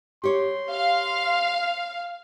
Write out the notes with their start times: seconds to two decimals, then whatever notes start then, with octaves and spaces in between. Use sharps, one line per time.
0.24 G4 C#5 C6
0.71 F5